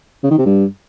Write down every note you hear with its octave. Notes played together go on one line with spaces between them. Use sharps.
C#3
D#3
C3
G2